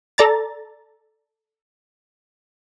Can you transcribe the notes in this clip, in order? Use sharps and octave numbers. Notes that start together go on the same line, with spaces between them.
A4 D5 A#5 A6